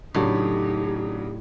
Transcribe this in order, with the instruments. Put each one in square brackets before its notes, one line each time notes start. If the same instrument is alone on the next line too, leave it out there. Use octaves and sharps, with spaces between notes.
[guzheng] A2 [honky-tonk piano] C#3 F#3 D4 [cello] D#4 [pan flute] G4